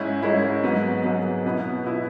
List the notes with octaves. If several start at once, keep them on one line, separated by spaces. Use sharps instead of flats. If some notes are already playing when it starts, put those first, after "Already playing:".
Already playing: G#2 G#3 C#4 E4
G#2 G#3 C#4 E4
G#2 F#3 B3
G#2 F#3 B3
B2 B3 E4
B2 B3 E4